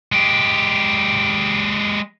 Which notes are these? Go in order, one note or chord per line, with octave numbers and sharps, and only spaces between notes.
G#3 G4